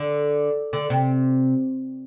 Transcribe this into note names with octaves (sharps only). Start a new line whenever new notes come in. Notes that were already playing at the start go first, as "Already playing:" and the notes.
Already playing: D3
D3
C3